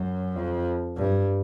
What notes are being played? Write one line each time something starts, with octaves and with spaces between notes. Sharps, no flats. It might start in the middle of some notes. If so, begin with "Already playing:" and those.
Already playing: F#2
F2
G2